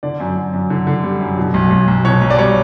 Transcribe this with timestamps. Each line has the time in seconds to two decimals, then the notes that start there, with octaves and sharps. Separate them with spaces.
0.03 D3 D5
0.20 F#2
0.37 F#2
0.53 F#2
0.70 D3
0.87 D3
1.04 G3
1.21 F#2
1.37 B2
1.54 B1
1.71 B1
1.88 B1
2.05 B2 C#5
2.22 B1
2.30 D5
2.38 G3 C#5